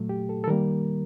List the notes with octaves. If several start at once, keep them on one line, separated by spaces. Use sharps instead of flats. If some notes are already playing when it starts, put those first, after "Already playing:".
Already playing: A#2 F#3 A3
G4
A4
A4
D#3 G3 A#3 A#4